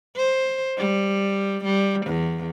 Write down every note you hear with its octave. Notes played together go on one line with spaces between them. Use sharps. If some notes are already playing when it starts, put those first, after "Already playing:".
C5
G3
G3
E2